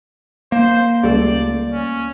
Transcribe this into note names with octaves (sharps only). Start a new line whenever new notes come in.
A#3 C5
C#2 G3 A3 D5
C#4